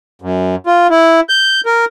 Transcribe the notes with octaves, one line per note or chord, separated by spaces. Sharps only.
F#2
F4
E4
G6
A#4